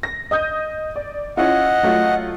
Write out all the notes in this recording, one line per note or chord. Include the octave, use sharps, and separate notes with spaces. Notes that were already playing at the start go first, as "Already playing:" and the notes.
A#6
D#5 D#6 G6
D5
C#4 E4 F4 D#5 F#5
F#3 A3 F4